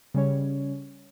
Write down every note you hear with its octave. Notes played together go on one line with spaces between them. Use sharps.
C#3 G3 C#4 C#5